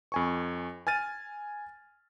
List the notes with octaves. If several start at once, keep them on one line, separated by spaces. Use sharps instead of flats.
F2 G#5 C#6
G#5 F6 A6 D#7